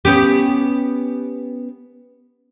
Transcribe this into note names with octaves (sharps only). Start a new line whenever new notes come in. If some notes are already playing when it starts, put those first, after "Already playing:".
B3 C#4 G4